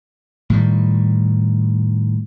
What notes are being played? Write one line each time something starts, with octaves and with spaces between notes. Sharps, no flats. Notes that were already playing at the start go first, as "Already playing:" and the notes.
A2 D#3 G3